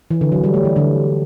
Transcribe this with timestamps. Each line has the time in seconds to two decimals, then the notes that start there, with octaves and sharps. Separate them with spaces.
0.11 E3
0.21 D3
0.32 F#3
0.44 G3
0.54 A3
0.65 E3
0.76 D3